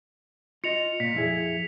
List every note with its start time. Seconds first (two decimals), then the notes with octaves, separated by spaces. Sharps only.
0.64 F4 D#5 C#7 F7
1.00 A#2 B6
1.15 F2 E4 G#4